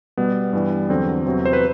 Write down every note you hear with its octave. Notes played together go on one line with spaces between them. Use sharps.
B2 G3 B3
G2 E3 G3
E2 D3 F#3 C4
E2 C3 F#3
C5
B4